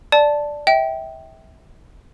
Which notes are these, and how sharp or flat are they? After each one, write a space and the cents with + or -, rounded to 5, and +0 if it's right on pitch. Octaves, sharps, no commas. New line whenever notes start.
D5 +0 A5 +0
E5 -25 G5 -10